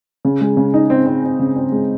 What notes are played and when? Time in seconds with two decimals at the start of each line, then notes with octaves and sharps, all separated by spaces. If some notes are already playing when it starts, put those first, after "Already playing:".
0.25 C#3
0.41 G#3
0.57 C#3
0.74 D#4
0.90 C4
1.07 C4
1.23 C4
1.39 C#3
1.56 C4
1.72 G#3